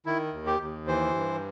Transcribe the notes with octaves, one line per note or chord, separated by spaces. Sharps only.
D#3 E4
D#2
G4
D#2
E3 C5
G2